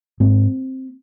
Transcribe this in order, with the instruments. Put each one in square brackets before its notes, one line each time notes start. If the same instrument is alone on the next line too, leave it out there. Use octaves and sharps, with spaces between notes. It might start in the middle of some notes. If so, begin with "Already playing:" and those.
[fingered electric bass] G#2 A#3 C4